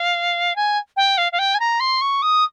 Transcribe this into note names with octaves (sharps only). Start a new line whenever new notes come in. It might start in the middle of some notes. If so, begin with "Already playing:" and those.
Already playing: F5
G#5
G5
F5
F5
G5
G#5
A#5
C6
C#6
D#6